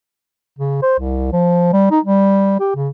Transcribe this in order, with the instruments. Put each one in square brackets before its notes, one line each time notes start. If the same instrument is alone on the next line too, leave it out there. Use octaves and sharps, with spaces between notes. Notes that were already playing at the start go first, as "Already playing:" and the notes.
[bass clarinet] C#3
C5
C2
F3
G3
D#4
G3
G4
C#3